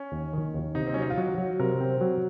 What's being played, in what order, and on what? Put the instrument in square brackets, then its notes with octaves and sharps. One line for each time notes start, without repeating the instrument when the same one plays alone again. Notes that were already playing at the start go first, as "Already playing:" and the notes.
Already playing: [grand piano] C#4
[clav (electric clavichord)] D#2
D#3
D#2
[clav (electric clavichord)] C3 [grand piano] D#4
[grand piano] C4
[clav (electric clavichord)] F#3 [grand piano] C#4
[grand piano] D#4
F4
[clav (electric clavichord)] F#3 [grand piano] F#4
[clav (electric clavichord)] F#3
[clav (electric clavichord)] C3 [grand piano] A#4
[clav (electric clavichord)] C4
F#3